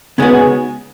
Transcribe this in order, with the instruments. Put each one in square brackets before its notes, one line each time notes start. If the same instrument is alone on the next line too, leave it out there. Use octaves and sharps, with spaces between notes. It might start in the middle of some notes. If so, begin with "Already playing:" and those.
[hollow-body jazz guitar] C#3 G#3 D#4 F#4 [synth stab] B3